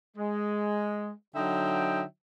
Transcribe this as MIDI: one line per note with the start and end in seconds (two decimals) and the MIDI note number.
0.17 1.12 56
1.36 2.03 50
1.36 2.03 54
1.36 2.03 63
1.36 2.03 76
1.36 2.03 79